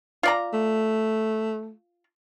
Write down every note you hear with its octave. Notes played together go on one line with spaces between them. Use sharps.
F4 D5 A#5
A3